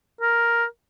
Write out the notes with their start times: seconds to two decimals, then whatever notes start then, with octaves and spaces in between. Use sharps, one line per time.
0.21 A#4